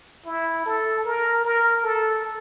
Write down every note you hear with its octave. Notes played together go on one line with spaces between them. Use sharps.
E4
A4
A#4
A#4
A4